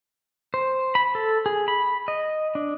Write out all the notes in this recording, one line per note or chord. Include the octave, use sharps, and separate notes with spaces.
C5
B5
A4
G#4
B5
D#5
D4